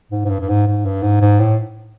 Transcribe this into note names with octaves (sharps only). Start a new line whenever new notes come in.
G#2
G#2
G2
G2
G#2
G#2
G2
G#2
G#2
A2